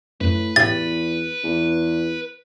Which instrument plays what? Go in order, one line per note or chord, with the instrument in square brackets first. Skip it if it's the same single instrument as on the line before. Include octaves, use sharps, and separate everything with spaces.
[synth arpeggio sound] F#2 [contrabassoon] A2 [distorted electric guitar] B4
[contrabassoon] E2 [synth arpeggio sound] A2 G4 E5 [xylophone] A6
[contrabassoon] E2